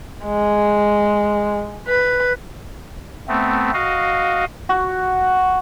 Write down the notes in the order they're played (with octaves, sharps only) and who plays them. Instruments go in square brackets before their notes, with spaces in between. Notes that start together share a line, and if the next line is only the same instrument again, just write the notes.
[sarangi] G#3
B4
[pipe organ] A3 B3 C4
F#4 D#5 F5
[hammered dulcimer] F#4